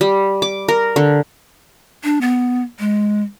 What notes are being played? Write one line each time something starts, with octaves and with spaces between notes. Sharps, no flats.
G3
D6
A#4
D3
D4
B3
G#3